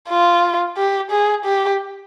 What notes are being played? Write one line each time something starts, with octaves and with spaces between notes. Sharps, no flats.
F4
G4
G#4
G4